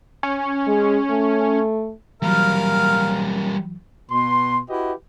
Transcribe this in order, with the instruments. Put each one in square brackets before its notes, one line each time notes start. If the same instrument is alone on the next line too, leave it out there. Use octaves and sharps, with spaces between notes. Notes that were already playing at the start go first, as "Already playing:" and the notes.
[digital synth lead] C#4
[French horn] G#3
A3
[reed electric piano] E3 F#3 [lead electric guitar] G3 A#3 [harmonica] A#4 F5
[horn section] B2 C6
E4 F#4 G4 B4 D#5